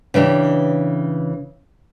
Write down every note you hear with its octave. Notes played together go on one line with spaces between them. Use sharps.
C#3 E3 D4 G4